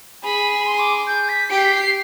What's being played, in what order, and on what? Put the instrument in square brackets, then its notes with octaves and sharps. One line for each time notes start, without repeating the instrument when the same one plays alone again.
[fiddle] G#4 [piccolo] B5
[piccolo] B5
C6
D6
G6
B6
[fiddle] G4 [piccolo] D7
[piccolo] C7
B6
C7